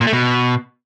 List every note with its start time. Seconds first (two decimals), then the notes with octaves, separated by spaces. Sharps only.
0.01 A#2
0.07 A3
0.13 B2